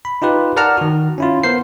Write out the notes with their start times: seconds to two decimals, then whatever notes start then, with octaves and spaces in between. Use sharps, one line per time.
0.05 B5
0.22 D#4 F4 G4 B4
0.57 A#4 D5 F#5 A5 A#5 F6
0.77 D#3 F#4
1.18 C#4 E4 F4
1.44 B3 A#4 C5 C7